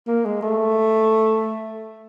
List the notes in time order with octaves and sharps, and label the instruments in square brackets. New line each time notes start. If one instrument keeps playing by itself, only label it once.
[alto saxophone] A#3
G#3
A3